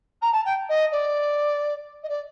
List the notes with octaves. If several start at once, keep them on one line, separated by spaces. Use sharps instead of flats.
A#5
A5
G5
D#5
D5
D#5
D5